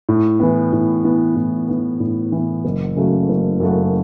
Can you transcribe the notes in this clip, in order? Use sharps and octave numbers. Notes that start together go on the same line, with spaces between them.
A2
E3 B3
A2
E3 B3
A2
E3 B3
A2
E3 B3
F#1
F#2 C#3 A3 F#4
F#1
F#2 C#3 A3 F#4